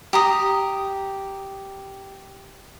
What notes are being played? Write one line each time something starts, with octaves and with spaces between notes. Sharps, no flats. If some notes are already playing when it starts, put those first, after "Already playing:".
G4 A#5 D#6